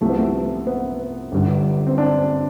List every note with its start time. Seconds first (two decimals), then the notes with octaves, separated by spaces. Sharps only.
0.01 C2 C3 F3 A3
0.10 B3
0.18 A3
0.67 B3
1.32 G1 G2 D3
1.87 C4
1.98 D4